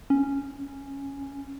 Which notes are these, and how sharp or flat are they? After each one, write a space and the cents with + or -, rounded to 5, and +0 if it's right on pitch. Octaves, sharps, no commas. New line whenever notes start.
C#4 -5